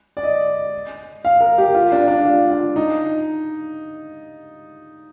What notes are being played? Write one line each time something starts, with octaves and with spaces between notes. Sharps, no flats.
D5
D#5
F5
A#4
G4
F4
D4
D4
F4
F4
D#4